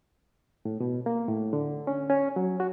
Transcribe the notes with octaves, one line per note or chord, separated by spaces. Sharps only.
A2
B2
A#3
A2
D3
C#4
C#4
F#3
F#4